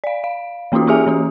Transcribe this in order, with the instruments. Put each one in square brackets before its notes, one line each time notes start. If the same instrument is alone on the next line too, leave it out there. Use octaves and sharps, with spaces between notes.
[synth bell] D5 F5
F5
E3 A#3 C#4 D#4 F4 F#4
C#4 E4 G4 G#4 E5 G#5
E3 C#4 F#4